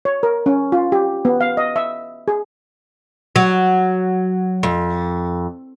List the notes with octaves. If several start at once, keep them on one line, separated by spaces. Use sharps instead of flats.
C#5
A#4
C#4
F4
G4
B3
F5
D#5
E5
G#4
F#3
F2